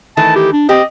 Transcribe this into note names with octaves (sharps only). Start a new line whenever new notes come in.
D#3 E3 A3 A5
G4
D4
C4 G4 D#5